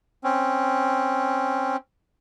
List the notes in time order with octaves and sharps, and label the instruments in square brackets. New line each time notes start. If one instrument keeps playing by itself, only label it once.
[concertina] C4 C#4